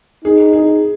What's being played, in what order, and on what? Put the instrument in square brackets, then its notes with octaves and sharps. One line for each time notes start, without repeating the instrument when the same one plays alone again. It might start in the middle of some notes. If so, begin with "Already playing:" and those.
[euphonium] D#4 [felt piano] G#4
[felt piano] G#4